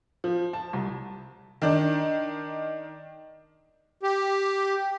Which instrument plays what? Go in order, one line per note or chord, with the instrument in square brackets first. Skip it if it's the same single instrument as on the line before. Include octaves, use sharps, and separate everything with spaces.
[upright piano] F3
A5
C2
[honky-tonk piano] D#3 D4
[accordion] G4